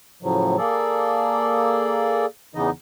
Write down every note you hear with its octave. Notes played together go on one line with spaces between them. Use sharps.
A2 C#3 F3 F#3
A#3 G#4 A4 D5
E2 C#3 E3 B3 D#4 D#5